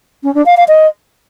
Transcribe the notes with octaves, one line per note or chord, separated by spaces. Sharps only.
C#4
D4
F5
F5
D#5